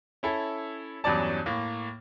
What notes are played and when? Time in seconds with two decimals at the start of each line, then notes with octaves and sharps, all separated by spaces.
0.23 C#4 E4 A4
1.04 E2 G2 F#3 C#4 D5 A5
1.46 A2 A#3